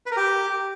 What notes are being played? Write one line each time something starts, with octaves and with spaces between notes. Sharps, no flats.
B4
A#4
G4